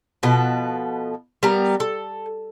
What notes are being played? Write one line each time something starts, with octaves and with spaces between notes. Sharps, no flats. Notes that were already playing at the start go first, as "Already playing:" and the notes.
B2 F3 A4 B4
G3 B3 A#4 A#5
A4